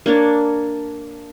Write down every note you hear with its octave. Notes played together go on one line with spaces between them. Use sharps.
A#3 D4 C#5 D5